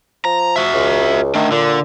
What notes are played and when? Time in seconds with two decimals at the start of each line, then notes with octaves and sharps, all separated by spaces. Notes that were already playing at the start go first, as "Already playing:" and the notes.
0.25 F3 A#5
0.56 F#4 E5
0.73 C#2
1.35 D#3 A3 D4
1.52 A#2 D3